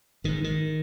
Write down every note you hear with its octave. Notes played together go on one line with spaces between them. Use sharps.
G#1 G#2 D#3
D#3